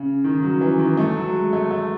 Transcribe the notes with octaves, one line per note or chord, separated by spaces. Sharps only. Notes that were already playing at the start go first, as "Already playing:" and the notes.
Already playing: C#3
D#3
F#3
E3
D#3
A3
F#3
G#3
A3
A3